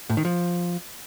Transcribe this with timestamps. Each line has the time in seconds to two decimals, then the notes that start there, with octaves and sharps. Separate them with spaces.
0.10 A2
0.17 D#3
0.25 F3